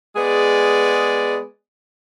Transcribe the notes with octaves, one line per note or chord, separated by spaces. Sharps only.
G#3 B3 G#4 D5